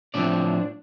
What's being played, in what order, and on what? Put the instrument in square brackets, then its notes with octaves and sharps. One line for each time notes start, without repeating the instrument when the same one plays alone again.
[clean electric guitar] A2 F3 C4 D4 D5